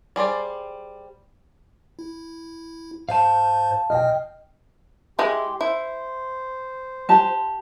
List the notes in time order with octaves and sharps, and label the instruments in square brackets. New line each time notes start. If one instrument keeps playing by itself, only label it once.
[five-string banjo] G3 G#4 C5 D5
[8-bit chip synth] E4
[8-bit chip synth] G#2 C5 G6 [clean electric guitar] F5 A5
[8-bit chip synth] B2 F6 [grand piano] D#5 G5
[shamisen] G#3 E4 [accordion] G4 C6
[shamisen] E4 [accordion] C5
[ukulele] G4 A5